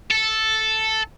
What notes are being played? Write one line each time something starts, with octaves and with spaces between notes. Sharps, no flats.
A4